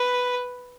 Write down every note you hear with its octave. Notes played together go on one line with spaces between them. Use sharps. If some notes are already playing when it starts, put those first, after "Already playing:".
Already playing: B4